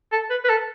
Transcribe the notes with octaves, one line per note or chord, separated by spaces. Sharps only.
A4
B4
B4
A4